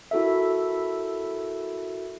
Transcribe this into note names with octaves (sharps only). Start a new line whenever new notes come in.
E4 F#4 A4 A#4 E5